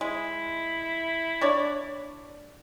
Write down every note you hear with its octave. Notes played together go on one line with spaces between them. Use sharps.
G#3 E4
D4 C#5 D5